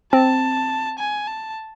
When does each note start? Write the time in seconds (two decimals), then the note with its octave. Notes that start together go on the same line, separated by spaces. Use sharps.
0.13 C4 A5
0.99 G#5
1.27 A5